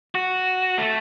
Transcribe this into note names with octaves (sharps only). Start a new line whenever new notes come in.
F#4
A3